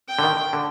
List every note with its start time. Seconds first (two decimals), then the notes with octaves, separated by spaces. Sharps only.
0.08 G5
0.19 D3
0.23 D#3
0.53 D3